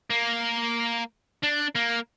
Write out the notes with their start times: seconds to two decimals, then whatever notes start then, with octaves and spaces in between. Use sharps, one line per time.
0.10 A#3
1.43 D4
1.75 A#3